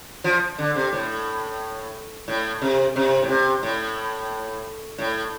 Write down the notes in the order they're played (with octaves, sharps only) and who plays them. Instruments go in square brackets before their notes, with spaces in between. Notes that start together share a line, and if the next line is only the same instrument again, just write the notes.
[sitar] F3
D3
C3
A2
A2
C3
C3
A2
C3
A2
A2